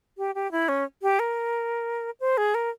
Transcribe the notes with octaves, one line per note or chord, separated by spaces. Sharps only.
G4
G4
E4
C#4
G4
A#4
C5
G#4
A#4